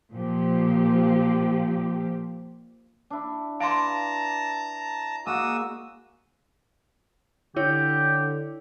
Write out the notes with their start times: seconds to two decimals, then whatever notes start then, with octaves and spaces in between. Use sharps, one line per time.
0.12 A#2 F3 G4
3.10 D4 E4
3.60 B4 F5 A5 A#5 C6 D6
5.26 G#3 A#3 F#4 G#4 D#6 E6
7.56 D3 E4 G4 C#5